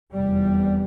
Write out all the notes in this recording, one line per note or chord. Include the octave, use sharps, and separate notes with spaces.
F1 E2 C3 G3